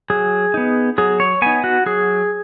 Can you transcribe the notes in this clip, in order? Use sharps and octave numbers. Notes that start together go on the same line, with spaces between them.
F#3 G#4
B3 D#4
F#3 G#4
C#5
B3 D#4 G#5
F#4
F#3 G#4